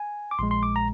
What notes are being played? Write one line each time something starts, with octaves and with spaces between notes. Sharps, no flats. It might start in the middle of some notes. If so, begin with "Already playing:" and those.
Already playing: G#5
D6
A#1 A#2 G#3 C6
C6
D6
A#5